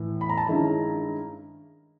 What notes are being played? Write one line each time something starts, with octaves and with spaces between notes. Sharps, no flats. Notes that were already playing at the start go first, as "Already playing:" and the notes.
Already playing: A2 E3 A3
B5
A#5
A5
G2 D#3 G#3 C#4 E4 A#5